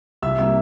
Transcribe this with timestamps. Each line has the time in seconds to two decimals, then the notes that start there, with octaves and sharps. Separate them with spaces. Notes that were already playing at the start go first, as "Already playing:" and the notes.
0.22 C2 E5 E6
0.39 C3 G3 A#3 E5 E6